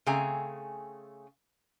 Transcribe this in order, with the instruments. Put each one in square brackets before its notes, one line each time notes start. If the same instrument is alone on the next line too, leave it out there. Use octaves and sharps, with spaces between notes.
[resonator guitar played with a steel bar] C#3 A3 C4 G#4 G#5 A#5